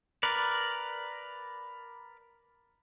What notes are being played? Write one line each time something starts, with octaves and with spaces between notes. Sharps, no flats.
A#4 B4 D5